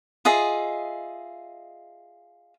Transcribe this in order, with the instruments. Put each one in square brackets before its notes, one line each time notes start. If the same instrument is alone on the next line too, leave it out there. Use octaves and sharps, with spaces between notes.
[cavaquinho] F4 G#4 D#5 E5